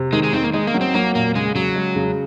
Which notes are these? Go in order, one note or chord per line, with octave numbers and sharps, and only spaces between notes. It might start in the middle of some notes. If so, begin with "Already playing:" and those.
Already playing: C3
D#3 G#3
G#3
D#3 C4
A#3
G#3 D#4
A#3
F#3
C4
F#3 A#3
A#2 A#3
C#3 G#3
C#3 F#3
G#3
C#3